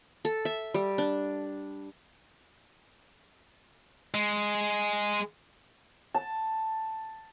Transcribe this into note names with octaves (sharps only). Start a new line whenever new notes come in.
A4
E5
G3
D4
G#3
A5